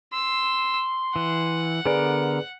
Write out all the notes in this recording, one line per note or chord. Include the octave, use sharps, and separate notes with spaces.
C6 E6
E3 F#5
D3 B3 G#4 A#4 B4 D5